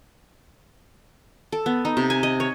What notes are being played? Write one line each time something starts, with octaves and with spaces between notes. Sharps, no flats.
A4
B3
D#4
C3
G#5
D#5
C#5